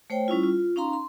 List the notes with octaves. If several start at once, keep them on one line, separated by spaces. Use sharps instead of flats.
A3 C5 C#5 G5
G3 C#4 E4 F4
F4
C#4 D#4 F5 A#5 C6
C6